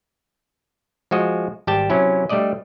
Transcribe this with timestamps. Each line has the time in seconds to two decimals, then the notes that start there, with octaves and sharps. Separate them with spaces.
1.11 F3 G#3 F#4 D#5
1.67 G#1 G3 G4 G5 A5
1.90 C3 F#3 C#4 E4
2.29 G3 A3 D4 D5 D#5